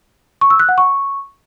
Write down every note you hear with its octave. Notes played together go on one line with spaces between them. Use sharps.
C#6
E6
F#6
F#5
C#6